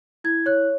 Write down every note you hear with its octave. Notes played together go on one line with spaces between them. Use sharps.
E4 G#6
C#5 F#6